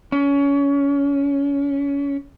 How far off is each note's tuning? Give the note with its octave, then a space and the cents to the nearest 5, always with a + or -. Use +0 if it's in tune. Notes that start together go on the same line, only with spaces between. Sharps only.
C#4 +25